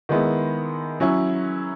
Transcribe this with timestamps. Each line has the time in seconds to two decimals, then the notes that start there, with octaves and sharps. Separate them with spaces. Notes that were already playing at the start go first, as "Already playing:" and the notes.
0.09 D#3 G#3 B3 E4
1.00 F#3 C#4 E4